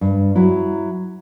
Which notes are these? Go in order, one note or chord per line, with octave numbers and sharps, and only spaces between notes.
G2
F#3 E4